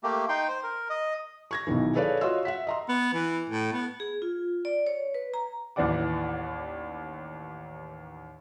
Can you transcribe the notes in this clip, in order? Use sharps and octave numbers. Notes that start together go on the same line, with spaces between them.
A3 A#3 G4
D#4 G5 C6
C5
A#4
D#5
C#6 G#6 A#6
B1 B2 D#3 E3
G#4 A4 B4 C#5 D5 F5
F4 F#4 C#5 D#5 C6 E6
E5 F#5 B6
D#5 A#5 C6
B3
E3
A2
B3
G#4
F4
D5
C#5
B4
A#5
A1 D#2 E3 D5 F#5 D6